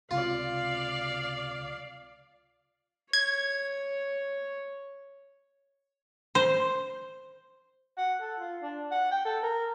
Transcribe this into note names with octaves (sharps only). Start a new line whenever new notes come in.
C#2 C3 F4 D5 F5
C#5 G#6
C5
F#5
A4
F4
D4
F#5
G5
A4
A#4